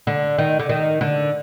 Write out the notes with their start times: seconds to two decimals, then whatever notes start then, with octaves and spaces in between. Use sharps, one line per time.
0.07 D3
0.38 D#3
0.59 D3
0.69 D#3
1.01 D3